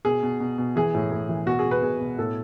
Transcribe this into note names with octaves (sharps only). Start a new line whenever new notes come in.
B2 G#4
B2
B2
B2
E3 G#4
A2
A2
E3
B2 F#4
G#4
B2
B4
B2 G#4
B2
A2 A4